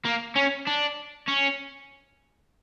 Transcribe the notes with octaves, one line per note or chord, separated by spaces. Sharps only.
A#3
C#4
D4
C#4